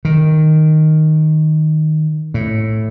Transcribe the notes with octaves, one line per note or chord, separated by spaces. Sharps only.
D#3
A2